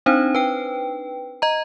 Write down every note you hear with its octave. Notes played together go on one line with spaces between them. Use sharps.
C4 D4 D#4 C5
B4 G5
D#5 A#5